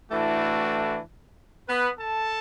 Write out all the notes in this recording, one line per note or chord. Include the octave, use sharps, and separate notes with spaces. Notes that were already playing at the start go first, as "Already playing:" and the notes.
A2 E3 A3 D4 F#4
B3 B4
A4 A5